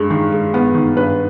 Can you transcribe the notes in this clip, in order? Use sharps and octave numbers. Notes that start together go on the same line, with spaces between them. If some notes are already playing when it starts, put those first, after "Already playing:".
Already playing: G2 G#3
D#3
G#3
B3
D#3
G2 B4